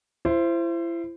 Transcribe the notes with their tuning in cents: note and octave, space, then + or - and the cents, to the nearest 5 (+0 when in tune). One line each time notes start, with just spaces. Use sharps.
E4 +35 C5 +0